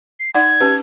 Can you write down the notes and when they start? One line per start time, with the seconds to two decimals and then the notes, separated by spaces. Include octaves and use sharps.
0.20 C7
0.35 D#4 D5 F#5 G#6
0.60 C#4 G4 B4